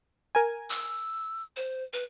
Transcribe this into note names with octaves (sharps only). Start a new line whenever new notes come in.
A#4 G#5
E6
C5
B4